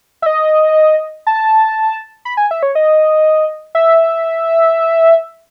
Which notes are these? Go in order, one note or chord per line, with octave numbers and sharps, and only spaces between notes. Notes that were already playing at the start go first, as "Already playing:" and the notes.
E5
D#5
A5
B5
G#5
E5
C#5
D#5
E5